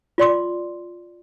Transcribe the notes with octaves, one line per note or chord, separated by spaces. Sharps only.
F4 D5 C6 D6